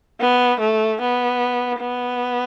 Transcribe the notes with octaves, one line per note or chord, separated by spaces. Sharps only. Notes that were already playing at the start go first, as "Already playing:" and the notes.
B3
A3
B3
B3